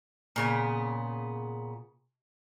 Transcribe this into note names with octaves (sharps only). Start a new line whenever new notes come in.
A#2 C#3 B3